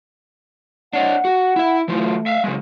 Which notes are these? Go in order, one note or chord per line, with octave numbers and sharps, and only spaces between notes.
D4 C#5 D#5 F#5
F#4
E4 E5
E3 F#3 A3 F4
E5 F5
C#3 F#3 G#3